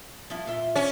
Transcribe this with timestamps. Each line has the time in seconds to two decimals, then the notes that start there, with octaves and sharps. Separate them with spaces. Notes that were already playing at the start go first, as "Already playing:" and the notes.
0.30 F3 G3 E4
0.46 A#2 F4 E5
0.76 C#4